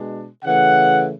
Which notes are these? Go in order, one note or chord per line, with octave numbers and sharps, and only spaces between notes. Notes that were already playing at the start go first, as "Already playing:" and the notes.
Already playing: B2 G#3 D4
C#3 E3 A3 F#5